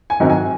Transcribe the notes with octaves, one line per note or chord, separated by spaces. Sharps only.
G#5
G#2 D#3 F#3 C4
G#5